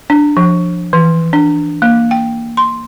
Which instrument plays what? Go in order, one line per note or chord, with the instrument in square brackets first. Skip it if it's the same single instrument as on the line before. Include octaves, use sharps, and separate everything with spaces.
[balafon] D4
F3
E3
D4
A#3
G5
C6